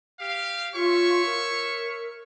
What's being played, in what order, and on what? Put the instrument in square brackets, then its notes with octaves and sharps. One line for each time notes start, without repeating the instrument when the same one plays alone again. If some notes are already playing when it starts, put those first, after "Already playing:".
[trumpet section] G4 F5
[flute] F4 [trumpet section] C#5 E5 C#6
[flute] A#4